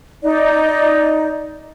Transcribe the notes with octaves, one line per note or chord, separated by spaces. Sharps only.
D#4 D5